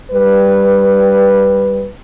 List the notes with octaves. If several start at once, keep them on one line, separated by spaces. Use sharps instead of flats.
G3 B4